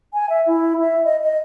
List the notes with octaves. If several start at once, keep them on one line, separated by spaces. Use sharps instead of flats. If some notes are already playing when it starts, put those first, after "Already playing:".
G#5
E5
E4
E5
D#5
D#5